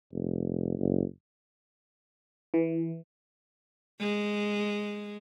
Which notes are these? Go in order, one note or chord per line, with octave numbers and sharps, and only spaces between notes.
F1
F#1
E3
G#3